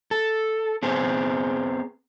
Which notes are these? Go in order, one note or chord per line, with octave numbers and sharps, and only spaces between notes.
A4
B3 C4 G#4